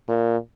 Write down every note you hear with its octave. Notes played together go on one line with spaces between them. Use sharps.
A#2